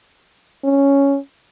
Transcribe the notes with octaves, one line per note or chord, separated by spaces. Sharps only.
C#4